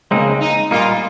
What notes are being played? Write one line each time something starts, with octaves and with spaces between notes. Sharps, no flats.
C#2 C#3 G#3 A#3 C4 D#4
D#4
A#2 G3 A#3 D#4 F4